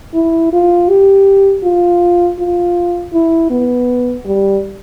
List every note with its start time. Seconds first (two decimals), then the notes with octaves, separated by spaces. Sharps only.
0.14 E4
0.53 F4
0.89 G4
1.64 F4
2.39 F4
3.13 E4
3.50 B3
4.26 G3